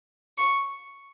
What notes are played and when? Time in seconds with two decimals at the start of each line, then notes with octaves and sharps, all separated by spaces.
0.38 C#6